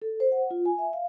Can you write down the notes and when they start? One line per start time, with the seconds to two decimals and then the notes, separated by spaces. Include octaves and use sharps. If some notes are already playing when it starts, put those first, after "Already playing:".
0.02 A4
0.20 C5
0.32 F#5
0.51 F4
0.65 G#5
0.78 E5
0.93 F5